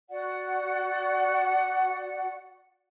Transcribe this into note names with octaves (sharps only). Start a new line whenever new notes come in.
F#4 D5 F#5